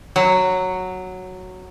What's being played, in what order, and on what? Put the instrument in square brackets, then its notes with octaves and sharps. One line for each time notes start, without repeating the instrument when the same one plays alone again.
[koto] F#3